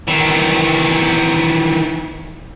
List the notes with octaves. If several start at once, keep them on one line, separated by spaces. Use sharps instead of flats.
D#3 E3